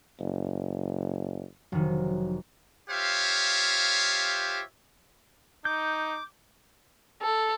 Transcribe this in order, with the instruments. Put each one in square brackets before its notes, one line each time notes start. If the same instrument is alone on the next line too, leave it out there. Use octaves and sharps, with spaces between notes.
[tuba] F#1
[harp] F1 D#3 [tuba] F#3
[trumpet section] F4 G4 C5 C#5 E5 F5
[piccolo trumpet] D#4 [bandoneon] D6 [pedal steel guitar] G6
[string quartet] A4